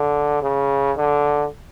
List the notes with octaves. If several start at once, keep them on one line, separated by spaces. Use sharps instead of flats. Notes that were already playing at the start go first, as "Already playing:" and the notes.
Already playing: D3
C#3
D3